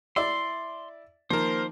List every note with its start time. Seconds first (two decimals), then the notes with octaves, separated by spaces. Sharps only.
0.16 E4 D5 E5 C6
1.30 D#3 F3 A#3 A#4 C5